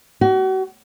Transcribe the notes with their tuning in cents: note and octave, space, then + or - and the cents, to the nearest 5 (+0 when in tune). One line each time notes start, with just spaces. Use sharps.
F#4 +35